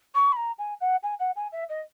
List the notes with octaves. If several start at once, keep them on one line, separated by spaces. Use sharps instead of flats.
C#6
B5
A#5
G#5
F#5
G#5
F#5
G#5
E5
D#5